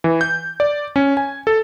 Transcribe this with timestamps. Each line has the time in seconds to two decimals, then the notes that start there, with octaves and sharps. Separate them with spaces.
0.04 E3
0.21 G6
0.60 D5
0.96 C#4
1.17 G#5
1.47 A4